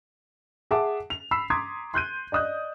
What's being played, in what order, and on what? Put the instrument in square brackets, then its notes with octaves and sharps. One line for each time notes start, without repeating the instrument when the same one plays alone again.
[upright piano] G#4 E5 F#5 A5 D6
F7
B5 E6 B6 C7
A#5 C6 D6 D#6 G#6
C6 F#6 G6 D#7
D5 D#5 D#6 F#6 G6